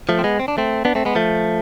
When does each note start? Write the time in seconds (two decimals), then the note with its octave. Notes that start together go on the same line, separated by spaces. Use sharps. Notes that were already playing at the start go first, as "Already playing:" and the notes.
0.09 F3 A3
0.19 C4
0.24 G#3 B3
0.40 C4
0.48 D4
0.58 A3 C4
0.85 B3 D4
0.95 A3 C4
1.05 G#3 B3
1.15 F3 A3